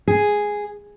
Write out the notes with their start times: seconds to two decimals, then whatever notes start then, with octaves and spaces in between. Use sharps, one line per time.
0.08 G#4